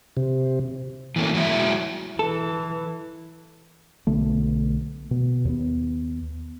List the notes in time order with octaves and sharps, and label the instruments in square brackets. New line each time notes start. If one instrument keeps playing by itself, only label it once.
[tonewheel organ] C3
[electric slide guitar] E3 A3 A#3 C#4
F#3 G#3 E4 E5
[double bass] E3 [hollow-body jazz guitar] A4
[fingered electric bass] B1 D3 A3
B2
D#2 B3